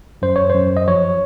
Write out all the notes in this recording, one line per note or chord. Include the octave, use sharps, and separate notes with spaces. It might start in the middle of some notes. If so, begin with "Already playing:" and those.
F#2 C5
C#5
C5
F#2
D#5
F3 C#5